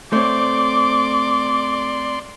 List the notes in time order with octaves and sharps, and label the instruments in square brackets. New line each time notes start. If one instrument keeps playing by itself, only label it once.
[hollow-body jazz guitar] A3 C4 C#5 [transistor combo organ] D5 C6 [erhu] D6